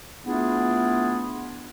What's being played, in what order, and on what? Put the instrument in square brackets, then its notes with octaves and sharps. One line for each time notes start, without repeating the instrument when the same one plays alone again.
[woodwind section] A3 B3 D4 E4 F4 G#4